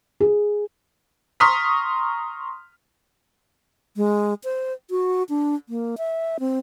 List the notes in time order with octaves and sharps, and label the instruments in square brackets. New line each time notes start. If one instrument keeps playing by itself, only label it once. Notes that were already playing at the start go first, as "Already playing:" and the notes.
[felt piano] G#4
[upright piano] A#5 C6 C#6 D#6 F6 B6
[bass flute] G#3
C5
F#4
D4
A#3
E5
C4